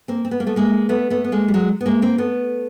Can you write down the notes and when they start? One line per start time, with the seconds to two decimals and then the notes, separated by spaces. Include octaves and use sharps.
0.08 A#3 C4
0.25 C4
0.31 B3
0.40 A#3
0.47 A3 B3
0.56 G#3 A#3
0.89 A3 B3
1.10 A3 B3
1.24 B3
1.32 G#3 A#3
1.48 G3
1.54 F#3 G#3
1.80 B3
1.86 G#3 A#3
2.02 A#3 C4
2.18 A3 B3